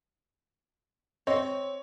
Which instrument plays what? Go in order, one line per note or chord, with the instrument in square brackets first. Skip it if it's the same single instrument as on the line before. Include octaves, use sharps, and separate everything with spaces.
[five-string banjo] C4 D#5 [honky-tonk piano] C#5